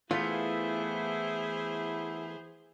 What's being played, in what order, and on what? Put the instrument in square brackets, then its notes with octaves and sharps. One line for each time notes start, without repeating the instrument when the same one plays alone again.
[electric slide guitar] E3 A3 B3 [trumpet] E4 [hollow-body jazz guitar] F4 [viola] G#4 C5